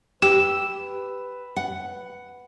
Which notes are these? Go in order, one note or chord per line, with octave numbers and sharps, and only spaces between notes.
G4 B4 E6
F#5